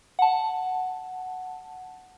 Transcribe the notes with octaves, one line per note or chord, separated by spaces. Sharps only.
F#5 A5